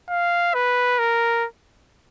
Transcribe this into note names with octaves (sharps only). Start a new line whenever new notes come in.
F5
B4
A#4